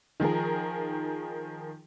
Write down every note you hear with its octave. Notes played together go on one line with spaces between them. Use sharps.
D#3 F3 G#4 A#4